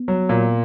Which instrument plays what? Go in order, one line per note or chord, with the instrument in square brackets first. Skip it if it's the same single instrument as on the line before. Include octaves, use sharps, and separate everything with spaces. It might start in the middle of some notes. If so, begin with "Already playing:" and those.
Already playing: [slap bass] B3
[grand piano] F#3
A#2